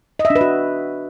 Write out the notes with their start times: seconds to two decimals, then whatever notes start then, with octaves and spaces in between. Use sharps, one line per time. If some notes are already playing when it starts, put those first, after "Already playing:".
0.19 D#5
0.25 E5
0.30 D4
0.35 B4
0.41 F#4